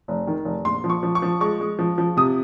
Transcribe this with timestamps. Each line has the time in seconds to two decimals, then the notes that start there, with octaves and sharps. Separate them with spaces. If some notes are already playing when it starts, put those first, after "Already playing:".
0.08 F1
0.27 D#3
0.45 F1
0.65 A#1 C6
0.84 F3
0.90 C#6
1.03 F3
1.15 C#6
1.22 F3
1.41 G#3 C#6
1.60 G#3
1.79 F3
1.98 F3
2.17 C3 D#6